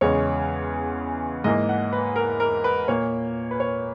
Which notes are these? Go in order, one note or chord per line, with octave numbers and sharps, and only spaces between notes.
E2 C#3 G#3 C#5
G#2 E3 A#3 D#5
F#5
B4
A#4
A#4
B4
A#2 A#3 C#5
B4
C#5